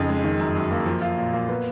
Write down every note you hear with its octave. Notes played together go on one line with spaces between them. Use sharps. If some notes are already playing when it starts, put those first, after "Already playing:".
Already playing: F2 C#3 D#4
G#3
D#3
F#2
F#2
A#3
F3
F4
A#2
A#3
B3